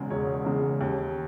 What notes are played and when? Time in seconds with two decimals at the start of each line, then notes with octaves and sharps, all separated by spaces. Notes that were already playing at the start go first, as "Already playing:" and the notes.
Already playing: E1 E2 C#3 G#3
0.10 E1 C#5
0.45 E2 C#3 G#3
0.81 D#2